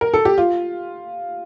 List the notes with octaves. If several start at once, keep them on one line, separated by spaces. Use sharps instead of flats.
A#4
A4
G4
F4